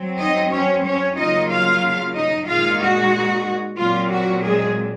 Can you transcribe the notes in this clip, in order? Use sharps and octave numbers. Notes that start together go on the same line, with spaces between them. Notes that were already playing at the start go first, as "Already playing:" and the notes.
Already playing: F#3 C4
D#4 D#5
C#4 C#5
C#4 C#5
C#3 F#3 A#3 D#4 F4 D#5
F4 F5
D#4 D#5
A#2 G#3 D#4 F4 F5
F#4
A#2 F#3 C4 F4
F#4
G#3 G#4